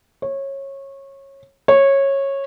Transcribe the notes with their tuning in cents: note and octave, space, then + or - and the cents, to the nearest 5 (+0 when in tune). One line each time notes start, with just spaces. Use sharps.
C#5 -20
C#5 -15